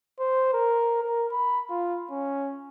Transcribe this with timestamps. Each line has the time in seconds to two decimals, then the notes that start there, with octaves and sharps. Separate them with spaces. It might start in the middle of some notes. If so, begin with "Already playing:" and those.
0.20 C5
0.53 A#4
1.02 A#4
1.32 B5
1.70 F4
2.11 C#4